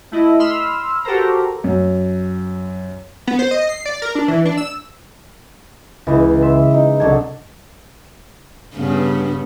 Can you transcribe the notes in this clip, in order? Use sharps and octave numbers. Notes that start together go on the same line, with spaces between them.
A3 E4 D#5
B5 C6 E6 F6
F#4 G4 A4 A#4 C5 A#5
F#2
B3
C5
D#5
C7
D5
A#4
D4
E3
D4
E6
C#2 E3 G#3 E4
E5 C6
D#4 D#5
C2 F#3 D4 A4 G#6
G2 C#3 B3